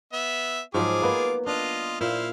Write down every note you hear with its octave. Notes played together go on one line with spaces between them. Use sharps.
B3 E5
G#2 F3 F#3 F4 G#4 D6
A#3 B3 D#5
D4 F4 D#5
A#2 E4 C5 F5